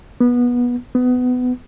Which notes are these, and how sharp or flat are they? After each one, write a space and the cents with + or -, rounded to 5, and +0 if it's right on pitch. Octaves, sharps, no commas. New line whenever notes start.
B3 -20
B3 +20